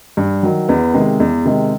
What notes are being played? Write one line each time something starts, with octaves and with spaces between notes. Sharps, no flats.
G2
D#3 F#3
E2 B3
C3 D#3 G#3
E2
C3 D#3 G#3